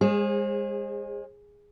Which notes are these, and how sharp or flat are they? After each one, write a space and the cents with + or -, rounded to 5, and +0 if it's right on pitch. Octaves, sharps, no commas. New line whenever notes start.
G#3 -30 G#4 -10 C5 +35